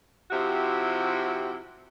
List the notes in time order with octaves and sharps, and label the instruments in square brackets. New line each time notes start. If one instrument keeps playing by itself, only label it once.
[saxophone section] C3 F3 E4 F#4 G4